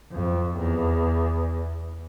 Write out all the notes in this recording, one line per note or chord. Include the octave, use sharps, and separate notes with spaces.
F2
E2